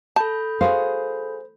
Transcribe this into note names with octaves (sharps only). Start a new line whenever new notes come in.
A4 A5 B5 G6
F#4 G#4 C5 F5